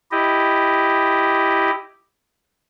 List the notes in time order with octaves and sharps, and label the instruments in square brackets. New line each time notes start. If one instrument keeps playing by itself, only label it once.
[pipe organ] E4 G4 D#5